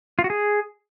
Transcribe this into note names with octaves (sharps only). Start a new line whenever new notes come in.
F4
F#4
G#4